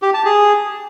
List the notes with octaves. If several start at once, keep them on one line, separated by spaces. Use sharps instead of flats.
G4
A5
G#4